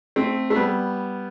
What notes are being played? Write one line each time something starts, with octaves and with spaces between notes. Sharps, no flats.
A3 C4
A3
G3 B3